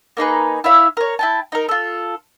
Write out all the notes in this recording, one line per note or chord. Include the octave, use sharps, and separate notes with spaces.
A#3 D#4 G#4 B4
E4 C#5 E5 F5
A#4 C#5
E4 G5 A5
D#4 A#4
F4 A4